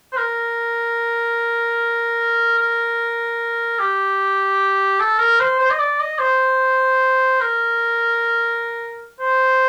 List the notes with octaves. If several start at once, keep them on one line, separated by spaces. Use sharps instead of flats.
C5
A#4
A#4
G4
A4
A#4
C5
C5
D#5
D5
D#5
C5
A#4
C5